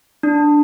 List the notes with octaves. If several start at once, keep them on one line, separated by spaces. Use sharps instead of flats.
D4